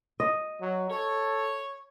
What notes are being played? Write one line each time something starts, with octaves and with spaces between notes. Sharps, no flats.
D#5
F#3
A4 C#5